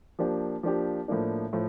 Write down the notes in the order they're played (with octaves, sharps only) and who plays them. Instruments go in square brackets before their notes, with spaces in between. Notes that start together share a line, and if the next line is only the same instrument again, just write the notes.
[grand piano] F3 A#3 D4 G4
F3 A#3 D4 G4
A2 F3 A#3 D4
A2 F3